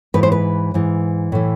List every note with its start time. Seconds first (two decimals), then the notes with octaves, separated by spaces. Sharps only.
0.14 G#2 E3 B4
0.23 C5
0.32 B4
0.74 G#2 E3
1.32 A2 E3